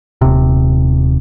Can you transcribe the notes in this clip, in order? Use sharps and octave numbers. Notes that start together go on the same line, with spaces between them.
D#1 C3